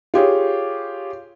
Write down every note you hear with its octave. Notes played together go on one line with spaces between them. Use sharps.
F4 G4 G#4 C#5